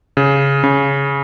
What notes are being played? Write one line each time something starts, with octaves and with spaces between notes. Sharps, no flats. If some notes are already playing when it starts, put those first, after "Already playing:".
C#3
C#3